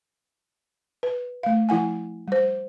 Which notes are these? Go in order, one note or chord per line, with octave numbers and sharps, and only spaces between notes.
B4
A3 F5
F3 E4 F#5 G#5
G3 C5